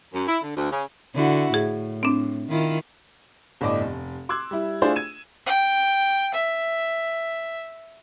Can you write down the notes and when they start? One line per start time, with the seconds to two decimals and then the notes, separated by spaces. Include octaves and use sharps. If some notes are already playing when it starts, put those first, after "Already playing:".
0.13 F#2
0.28 E4
0.43 D3
0.56 D2
0.71 C#3
1.15 D3 E4 F#4
1.54 A2 G#4
2.03 C4 D4
2.48 D#3 E4 F4
3.61 G1 A2 D5 D#5 D6
3.80 F1
4.29 C6 D6 E6 F#6 G#6
4.51 G3 E4
4.82 A3 D4 E4 F4 G#4 C5
4.96 G#6 D#7 E7
5.46 G5
6.34 E5